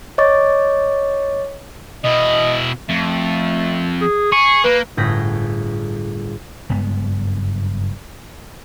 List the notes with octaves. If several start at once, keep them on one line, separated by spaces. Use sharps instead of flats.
C#5 D#5 C#6 D6 A6
B2 E4 D#5
F2 A3
G#4
G#4 C#6
A#3 B4
G1 A2 G#4 G6 A#6 B6
F#1 G2 G#3 B3